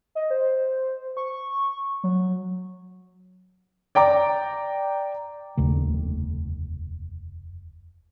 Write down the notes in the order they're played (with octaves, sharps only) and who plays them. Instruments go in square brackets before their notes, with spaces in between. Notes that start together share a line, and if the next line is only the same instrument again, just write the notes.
[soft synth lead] D#5
C5
C#6
F#3
[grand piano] D5 G5 A#5 D6
[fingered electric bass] F1 D#2 C#3 A3